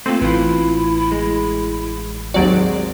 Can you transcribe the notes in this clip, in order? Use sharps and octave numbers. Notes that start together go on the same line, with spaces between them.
A3 A#3 C4 F4
A1 B3 E4 F4
G#3
D#2 F#3 G#3 C4 F#4 D5